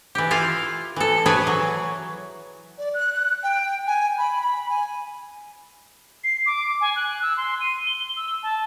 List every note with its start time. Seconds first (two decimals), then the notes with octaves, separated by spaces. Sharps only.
0.15 E3 G4
0.31 E4 F4 F5
0.96 E3 A4
1.26 G#4 B4 C#5 D5 E5
1.47 E3 F#3
2.78 D5
2.94 F#6
3.14 F#6
3.43 G5
3.87 G#5
4.18 B5
4.41 B5
4.70 G#5
6.24 C7
6.46 D6
6.81 G#5
6.96 F#6
7.22 E6
7.37 C6
7.60 D#7
7.86 G7
8.16 E6
8.43 A5